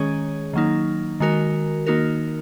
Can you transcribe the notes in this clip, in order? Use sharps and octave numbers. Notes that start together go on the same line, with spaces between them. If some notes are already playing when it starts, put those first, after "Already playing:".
Already playing: D#3 G#3 C#4 G#4 C#5
D#3 F#3 A#3 D#4
D#3 G#3 F#4 A#4
D#3 A#3 D#4 F#4 A#4